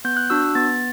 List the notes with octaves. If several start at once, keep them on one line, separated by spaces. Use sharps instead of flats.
B3 G6
F#6
D4 F#4 E6
B3 A6